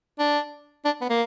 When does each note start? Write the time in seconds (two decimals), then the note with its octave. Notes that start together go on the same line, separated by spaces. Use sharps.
0.19 D4
0.85 D4
1.01 B3
1.10 A#3